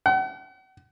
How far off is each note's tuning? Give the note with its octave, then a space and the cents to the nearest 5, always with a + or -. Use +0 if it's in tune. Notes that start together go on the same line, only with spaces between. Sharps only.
F#5 +40